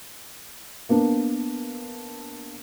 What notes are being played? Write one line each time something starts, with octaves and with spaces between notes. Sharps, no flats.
A#3 B3 D4